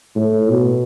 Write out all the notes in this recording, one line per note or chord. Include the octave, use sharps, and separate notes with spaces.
A2
B2